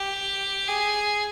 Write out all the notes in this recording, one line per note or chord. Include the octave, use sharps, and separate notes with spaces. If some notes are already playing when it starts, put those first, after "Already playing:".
Already playing: G4
G#4